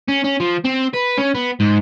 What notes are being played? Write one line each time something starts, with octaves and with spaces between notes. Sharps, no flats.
C#4
C#4
F3
C4
B4
C#4
B3
G#2